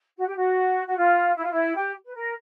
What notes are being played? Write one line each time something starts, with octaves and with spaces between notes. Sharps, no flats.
F#4
G4
F#4
F#4
F4
E4
F4
E4
G4
B4
A#4